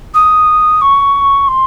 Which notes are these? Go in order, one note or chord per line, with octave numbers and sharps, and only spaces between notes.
D#6
C#6
C6